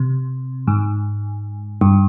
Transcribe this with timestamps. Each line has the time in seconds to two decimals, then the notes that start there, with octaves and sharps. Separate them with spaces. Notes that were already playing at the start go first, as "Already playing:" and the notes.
Already playing: C3
0.68 G#2
1.81 G2